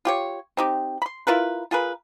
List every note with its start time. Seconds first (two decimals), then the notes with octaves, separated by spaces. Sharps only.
0.05 F4 G4 C#5
0.57 C4 D#4 G4
1.02 B5 C6
1.27 E4 F4 A#4 B4
1.71 F4 G#4 A#4 B4